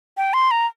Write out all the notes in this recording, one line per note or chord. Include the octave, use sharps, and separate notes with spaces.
G5
C6
A#5